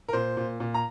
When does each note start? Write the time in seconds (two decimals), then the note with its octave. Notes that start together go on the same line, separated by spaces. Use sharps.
0.08 A#4
0.13 A#2 C5
0.37 A#2
0.60 A#2
0.74 A#5